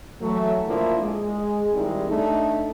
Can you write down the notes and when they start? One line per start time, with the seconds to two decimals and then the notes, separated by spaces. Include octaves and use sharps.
0.21 E3 F#3 A3
0.68 A#2 D3 F3 A#3 E4
1.03 G#3
1.74 D#3 G3 G#3 C4 D#4 E4
2.09 A3 D4 D#4